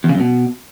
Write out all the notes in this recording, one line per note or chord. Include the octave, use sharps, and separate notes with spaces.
E2
C#3
F#2
B2